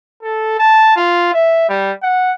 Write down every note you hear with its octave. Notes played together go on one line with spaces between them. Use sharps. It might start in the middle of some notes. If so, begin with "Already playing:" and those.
A4
A5
F4
E5
G3
F#5